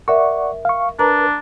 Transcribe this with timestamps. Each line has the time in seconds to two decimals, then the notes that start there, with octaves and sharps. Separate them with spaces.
0.08 A#4 D5 E5 F#5 C#6
0.65 F5 C#6
0.99 D4 A#4 B4 A#5